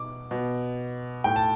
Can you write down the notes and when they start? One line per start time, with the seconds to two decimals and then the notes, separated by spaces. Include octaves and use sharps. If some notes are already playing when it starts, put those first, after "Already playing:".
Already playing: B2 D6
0.31 B2
1.24 A2 G5
1.36 A5